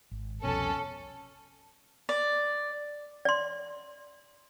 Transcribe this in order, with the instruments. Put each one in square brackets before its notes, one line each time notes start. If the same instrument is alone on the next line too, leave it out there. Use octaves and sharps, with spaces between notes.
[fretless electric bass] G#1
[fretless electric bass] C2 F2 B2 [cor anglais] C#4 [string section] A4
[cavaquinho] D5
[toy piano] D5 C6